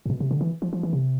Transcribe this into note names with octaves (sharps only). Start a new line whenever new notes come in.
A2
B2
C3
D3
E3
F3
F3
E3
C3